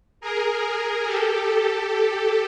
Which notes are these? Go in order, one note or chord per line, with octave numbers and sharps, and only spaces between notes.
G#4 A#4
G4 A4
G4 A4